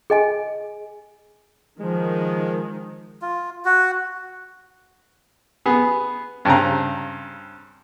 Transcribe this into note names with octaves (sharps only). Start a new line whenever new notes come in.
G#4 D#5 G#5
D#3 F3 G#3
F4
F#4
B3 G#4
G2 C#3 C4 A#5